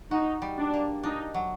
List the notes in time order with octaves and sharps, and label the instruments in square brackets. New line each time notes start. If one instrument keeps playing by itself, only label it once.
[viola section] D#4 [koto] F#4
[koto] G3
[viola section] D4
[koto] A#3
[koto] D4 [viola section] D#4
[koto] F#3